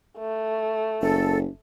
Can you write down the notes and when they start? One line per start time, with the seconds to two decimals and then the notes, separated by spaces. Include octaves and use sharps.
0.19 A3
1.02 F#1 A4